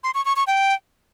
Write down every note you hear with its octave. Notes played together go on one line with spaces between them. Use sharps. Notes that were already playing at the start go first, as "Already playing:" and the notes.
C6
C#6
C#6
C#6
G5